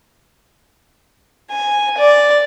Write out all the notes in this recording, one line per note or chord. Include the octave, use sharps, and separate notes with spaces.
G#5
D5